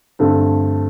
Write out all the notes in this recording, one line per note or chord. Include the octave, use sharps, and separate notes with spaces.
G2 D3 A3 C4